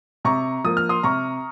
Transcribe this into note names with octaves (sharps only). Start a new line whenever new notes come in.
C3 A#5 C#6
F3 A#3 D#6
F6
C6 D#6
C3 A#5 C#6